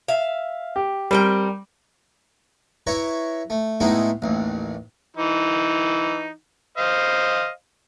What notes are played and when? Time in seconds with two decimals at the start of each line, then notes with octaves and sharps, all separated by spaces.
0.08 E5 F5
0.76 G4
1.11 G3 C4 A#4 G5
2.87 E4 B4 C#5 A#5 C#6
3.50 A3
3.80 A2 G#3 A3 B3 D#4 E4
4.22 A1 D#2
5.17 E3 D#4
6.78 C5 D#5 F5